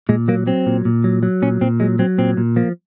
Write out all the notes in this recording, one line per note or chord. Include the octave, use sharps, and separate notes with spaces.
A#2 G#3
F#3 A#3
F#3 C4
A#2
A#2
F#3
F#3
A#2 C#4
A#2 C4
F#3 G#3
F#3 C4
A#2 C4
A#2
F3 A#3